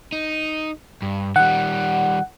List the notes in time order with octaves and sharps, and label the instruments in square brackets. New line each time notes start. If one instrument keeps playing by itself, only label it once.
[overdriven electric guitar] D#4
G2
[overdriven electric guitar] D#3 G3 [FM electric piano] F#5